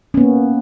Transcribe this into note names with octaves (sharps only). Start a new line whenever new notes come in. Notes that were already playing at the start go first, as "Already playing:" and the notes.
A#3 B3 C#4